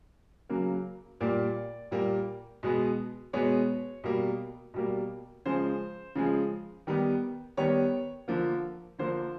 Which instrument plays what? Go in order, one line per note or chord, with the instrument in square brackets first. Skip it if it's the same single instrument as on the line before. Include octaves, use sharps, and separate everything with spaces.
[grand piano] C#3 F#3 A#3
A#2 G3 A#3 D5
A#2 G3 A#3
B2 G#3 B3
B2 G#3 B3 C#5
B2 G3 A#3
B2 G3 A#3
C#3 F3 G#3 C5
C#3 F3 G#3
D#3 G3 B3
D#3 G3 B3 C#5
D3 F3 A#3
D3 F3 A#3 C5